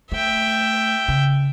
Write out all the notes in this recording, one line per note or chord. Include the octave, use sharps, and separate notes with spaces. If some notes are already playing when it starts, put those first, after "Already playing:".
A3 E5 G5
C#3